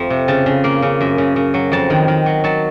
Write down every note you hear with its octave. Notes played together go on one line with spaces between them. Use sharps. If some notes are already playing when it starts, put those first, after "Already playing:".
Already playing: F2 F3 A3
C3
C#3 A5
C#3
A#3
C#3
F#2
C#3
C#3
F#3
F2 A5
D#3
D#3
F#3
F#3 A5